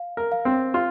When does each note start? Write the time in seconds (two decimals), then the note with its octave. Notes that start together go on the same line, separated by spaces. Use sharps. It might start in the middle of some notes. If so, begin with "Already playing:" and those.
Already playing: F5
0.17 A#4
0.32 F5
0.45 C4
0.74 F4